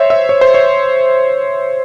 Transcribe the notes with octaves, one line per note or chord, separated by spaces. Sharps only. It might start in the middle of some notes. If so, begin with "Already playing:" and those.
Already playing: C5 C#5 E5
E5
C#5
C5
C#5